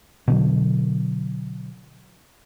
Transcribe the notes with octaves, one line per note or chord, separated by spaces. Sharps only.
B2 D3 F#3